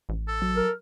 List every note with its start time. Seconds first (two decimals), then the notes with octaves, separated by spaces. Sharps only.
0.09 A1
0.28 A4
0.42 F#3
0.56 A#4